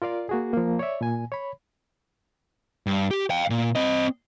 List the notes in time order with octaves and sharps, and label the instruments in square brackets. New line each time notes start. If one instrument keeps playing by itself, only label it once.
[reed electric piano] F4 A#4 D5 F5
A#3 F#4 G#4
F3 A#3
C#5 D5 E5
A#2 G#5
C#5 B5
[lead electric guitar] G2
G4
F5 G5
A#2
C4 D#5